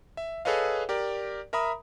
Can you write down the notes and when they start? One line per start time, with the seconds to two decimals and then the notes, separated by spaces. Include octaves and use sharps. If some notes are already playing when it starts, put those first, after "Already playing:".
0.17 E5
0.45 G#4 A4 B4 C#5 D#5 F5
0.89 G4 A#4 D5
1.53 A#4 E5 A#5 B5 D#6